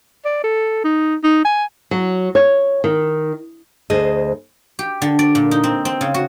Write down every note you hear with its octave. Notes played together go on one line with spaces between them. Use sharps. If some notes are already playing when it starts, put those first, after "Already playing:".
D5
A4
D#4
D#4
G#5
F#3
C#5
D#3
D2 G#4 C5 D#5
G4
D3
D5
A#2
D#4
C4
C4
C#3
F#4